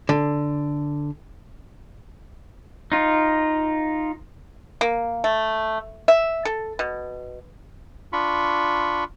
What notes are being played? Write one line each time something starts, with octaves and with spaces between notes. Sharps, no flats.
D3
D#4 F4
A#3
A3
E5
A4
B2
D4 F4 B5 C#6